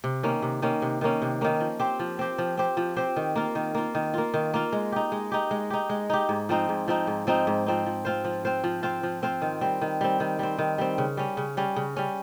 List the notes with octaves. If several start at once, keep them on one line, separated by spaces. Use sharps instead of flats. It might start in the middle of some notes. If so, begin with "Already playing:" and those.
C3
D#3 A#3 C#4
C3
D#3 A#3 C#4
C3
D#3 A#3 C#4
C3
D#3 A#3 C#4
F3
C4 G4 C5
F3
C4 G4 C5
F3
C4 G4 C5
F3
C4 G4 C5
D#3
A#3 F4
D#3
A#3 F4
D#3
A#3 F4
D#3
A#3 F4
G#3
D#4 G4
G#3
D#4 G4
G#3
D#4 G4
G#3
D#4 G4
G#2
F3 C4 D#4
G#2
F3 C4 D#4
G#2
F3 C4 D#4
G#2
F3 C4 D#4
F3
C4 F4 C5
F3
C4 F4 C5
F3
C4 F4 C5
F3
C4 F4 C5
D#3
G3 C4
D#3
G3 C4
D#3
G3 C4
D#3
G3 C4
C#3
G3 C#4
C#3
G3 C#4
C#3
G3 C#4